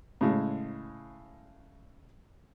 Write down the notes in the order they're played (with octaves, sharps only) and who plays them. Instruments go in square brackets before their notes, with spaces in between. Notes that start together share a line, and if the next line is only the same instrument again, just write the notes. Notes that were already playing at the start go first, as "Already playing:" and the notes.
[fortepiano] A2 C#3 G#3